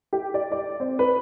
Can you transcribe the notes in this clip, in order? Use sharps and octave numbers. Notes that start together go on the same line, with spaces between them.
G4
D5
D5
C4
B4